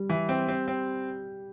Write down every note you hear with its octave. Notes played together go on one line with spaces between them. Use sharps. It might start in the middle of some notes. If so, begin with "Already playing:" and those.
Already playing: G3
E3
C4
C4
C4